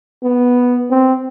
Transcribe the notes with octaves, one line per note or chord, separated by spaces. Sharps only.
B3
C4